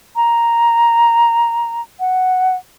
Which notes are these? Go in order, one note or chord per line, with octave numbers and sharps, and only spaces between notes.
A#5
F#5